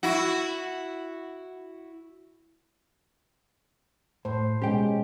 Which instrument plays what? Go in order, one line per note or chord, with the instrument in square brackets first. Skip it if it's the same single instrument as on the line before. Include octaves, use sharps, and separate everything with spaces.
[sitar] E4 F#4
[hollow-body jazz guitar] A2 [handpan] C5
[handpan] B2 G#3 C#4 [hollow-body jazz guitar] G4 G5